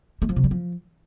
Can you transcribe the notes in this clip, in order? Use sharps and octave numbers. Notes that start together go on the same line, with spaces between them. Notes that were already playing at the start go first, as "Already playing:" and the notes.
A3
F3
C3
G3
F3